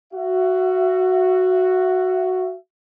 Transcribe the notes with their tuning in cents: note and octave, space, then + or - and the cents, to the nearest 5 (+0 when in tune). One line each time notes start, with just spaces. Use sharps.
F#4 +0 E5 +35